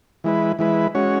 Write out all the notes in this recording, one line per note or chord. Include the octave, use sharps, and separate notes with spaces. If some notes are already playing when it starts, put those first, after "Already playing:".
E3 G#3 E4 B4
E3 G#3 E4 B4
G#3 C#4 F#4 C#5